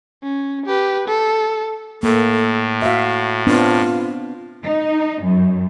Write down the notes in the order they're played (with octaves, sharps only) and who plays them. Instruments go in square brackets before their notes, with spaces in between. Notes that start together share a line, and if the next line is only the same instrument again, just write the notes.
[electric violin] C#4
G4 B4
A4
[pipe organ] A2 [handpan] A#3 [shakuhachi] A4
[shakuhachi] F#4 [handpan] E5 F5
[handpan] B3 C4 D4 [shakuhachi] F4
[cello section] D#4
F#2